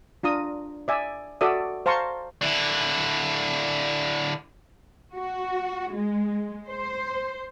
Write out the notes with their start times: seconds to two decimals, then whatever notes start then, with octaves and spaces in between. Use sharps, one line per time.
0.23 D4 F4 A#5 D#6
0.88 D5 E5 G#5
1.41 F#4 A4 D5 E5 D#6
1.86 C5 F5 A5 A#5 C6 C#6
2.41 D3 E4
5.14 F#4
5.93 G#3
6.67 C5